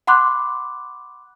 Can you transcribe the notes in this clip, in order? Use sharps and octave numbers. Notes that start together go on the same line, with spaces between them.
F#5 B5 C6 D6 F#6